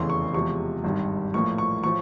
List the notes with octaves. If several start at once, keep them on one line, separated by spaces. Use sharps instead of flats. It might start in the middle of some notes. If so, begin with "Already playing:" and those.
Already playing: F1 E2 C#3 E3 C6
C#6
E2 C3 F3 G#3 C#6
G#1 G2 D#3 G3
A#1 A2 F3 A#3 C#6
C#6
A2 F3 C#6